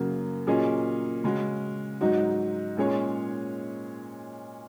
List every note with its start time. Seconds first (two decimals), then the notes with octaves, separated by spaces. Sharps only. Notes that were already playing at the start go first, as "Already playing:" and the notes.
Already playing: F#2 C#3 A#3 F#4
0.47 A#2 F#3 C#4 G#4 D#5
1.24 C#3 G#3 C#4 F#4
2.01 G#2 F#3 D#4 F#4
2.77 A#2 G#3 C#4 G#4 C#5